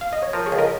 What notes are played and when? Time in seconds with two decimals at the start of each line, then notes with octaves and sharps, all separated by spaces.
0.01 F5
0.13 D#5
0.22 C#5
0.33 F3 A#4
0.46 G#4 C#5
0.52 C#2
0.58 A#4 D#5